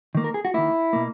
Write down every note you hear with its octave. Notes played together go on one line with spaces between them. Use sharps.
D#3 A#3
A#4
G#4
F#4
D#3 A#3 E4
B2 A#3